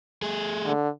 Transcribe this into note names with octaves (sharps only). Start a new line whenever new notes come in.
A3 G#4
D3